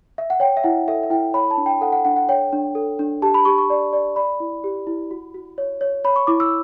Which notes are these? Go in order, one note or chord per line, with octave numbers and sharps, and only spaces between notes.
E5
F#5
C#5 G5
E5
E4 F#5
A4 E5
E5
E4 G5
C#5 B5
A5
D4
G5
A4 F#5
F#5
D4 F#5
F#5
C#5 G5
D4
A4
D4
G4 A5
B5
G4 C#6
C#6
D5
D5
D5 B5
E4
G4
E4
F#4
F#4
C#5
C#5
C#5 B5
C#6
E4 D6
E6